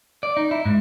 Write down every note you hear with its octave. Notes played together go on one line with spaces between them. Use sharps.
D5
D#4
E4
G#2